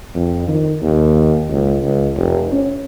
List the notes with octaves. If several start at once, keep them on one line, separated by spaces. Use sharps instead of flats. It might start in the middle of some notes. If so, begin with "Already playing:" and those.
F2
D#3
D#2
C#2
C#2
F1
C#4